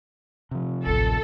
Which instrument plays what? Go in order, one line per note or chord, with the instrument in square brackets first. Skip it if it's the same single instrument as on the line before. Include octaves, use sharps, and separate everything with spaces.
[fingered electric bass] C3 F3
[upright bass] A1 D2 [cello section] A4